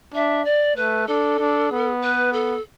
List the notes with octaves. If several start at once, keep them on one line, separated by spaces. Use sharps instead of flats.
D4 E5
D5
A3 B4
D4 A4
D4
B3
B4
A4